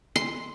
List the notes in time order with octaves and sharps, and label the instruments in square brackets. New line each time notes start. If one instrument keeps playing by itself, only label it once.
[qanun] C6